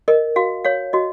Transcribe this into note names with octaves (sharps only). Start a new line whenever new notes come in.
A#4 D#5
F#4 F5
C#5 F5
F#4 D#5